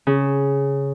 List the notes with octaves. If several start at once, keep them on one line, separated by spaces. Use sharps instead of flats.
C#3